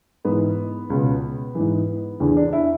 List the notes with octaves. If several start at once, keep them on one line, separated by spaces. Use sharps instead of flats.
G#2 E3 B3
C#2 B2
G#2 E3
E2 D3
D4
E4